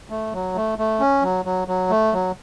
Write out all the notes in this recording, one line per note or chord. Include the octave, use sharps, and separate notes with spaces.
A3
F#3
A3
A3
C#4
F#3
F#3
F#3
A3
F#3